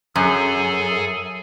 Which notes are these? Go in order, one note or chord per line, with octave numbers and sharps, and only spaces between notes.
F#2 G#4 A4 G#5